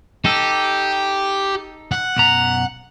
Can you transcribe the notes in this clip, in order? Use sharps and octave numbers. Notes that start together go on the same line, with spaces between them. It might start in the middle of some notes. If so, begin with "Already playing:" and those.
D#4 G4 A4
F#5
B1 F#2 A#5